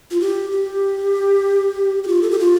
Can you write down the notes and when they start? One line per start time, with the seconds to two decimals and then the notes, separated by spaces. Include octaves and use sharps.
0.11 F4
0.21 G4
0.52 G4
2.03 G4
2.08 F4
2.22 A4
2.31 G4
2.39 F4